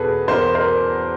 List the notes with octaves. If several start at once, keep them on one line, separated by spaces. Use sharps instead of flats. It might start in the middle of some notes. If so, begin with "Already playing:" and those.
Already playing: E2 B2 G#4 A4 B4
E2 A#4 C5
A#4 C5